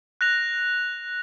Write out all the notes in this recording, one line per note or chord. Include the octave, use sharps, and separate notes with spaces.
F#6 A#6 F7